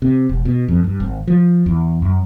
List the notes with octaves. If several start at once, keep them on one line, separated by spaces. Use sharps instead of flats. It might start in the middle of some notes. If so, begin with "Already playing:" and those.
C3
E1
B2
F2
G2
G#1
F3
E2
F#2